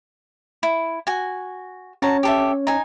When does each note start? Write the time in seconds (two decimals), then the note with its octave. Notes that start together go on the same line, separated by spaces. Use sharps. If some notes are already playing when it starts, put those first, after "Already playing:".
0.63 E4
1.07 F#4 G#5
2.02 C#4 F#4 C#5 A5 A#5
2.23 G4 A4 E5
2.67 D#4 G#5